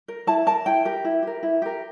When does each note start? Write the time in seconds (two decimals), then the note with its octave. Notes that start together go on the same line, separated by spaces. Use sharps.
0.08 A#4
0.27 E4 A5
0.46 A#4 A5
0.66 E4 G5
0.85 G4 A#4
1.05 E4
1.23 G4 A#4
1.43 E4
1.62 G4 A#4